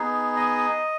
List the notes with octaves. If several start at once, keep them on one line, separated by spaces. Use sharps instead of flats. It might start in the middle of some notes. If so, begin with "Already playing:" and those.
Already playing: B3 D#4 G#4
D#5